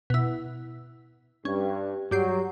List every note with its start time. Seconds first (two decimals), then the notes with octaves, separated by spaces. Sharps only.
0.10 B2 E4
1.45 G2 C#4
2.11 G2 F#3 G4 C7